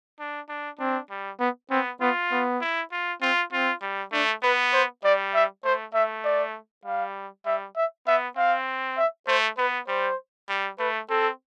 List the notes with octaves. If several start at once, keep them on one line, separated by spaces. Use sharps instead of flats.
D4
D4
C4 D4
G3
B3
B3 C4
B3 F4
B3
E4
F4
C4 F4
C4 F4
G3
A3 D4
B3 B4
C5
G3 D5
E5
A3 C5
A3 E5
D5
G3 F5
G3 E5
E5
B3 E5
C4 F5
E5
A3 C5
B3 B4
G3 C5
G3
A3 B4
C4 A4